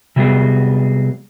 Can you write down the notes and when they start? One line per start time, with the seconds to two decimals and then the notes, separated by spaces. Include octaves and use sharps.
0.16 C3 F#3 G3 A#3 B3 G#4